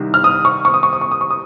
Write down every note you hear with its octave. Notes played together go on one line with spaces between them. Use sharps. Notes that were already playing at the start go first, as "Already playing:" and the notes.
Already playing: C2 C3 D#3
F6
D#6
C#6
C#6
D#6
C#6
D#6
C#6
D#6
C#6
D#6